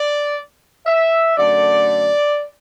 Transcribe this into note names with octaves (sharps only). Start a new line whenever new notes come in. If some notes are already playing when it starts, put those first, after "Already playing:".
Already playing: D5
E5
F#2 D3 A3 D5